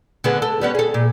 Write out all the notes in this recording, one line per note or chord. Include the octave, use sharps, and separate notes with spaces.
D3 B3 G#4
A4
G3 B3 C#4
G#4 A4
A#2